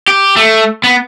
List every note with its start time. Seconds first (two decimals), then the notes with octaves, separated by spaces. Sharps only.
0.08 G4
0.36 A3
0.84 B3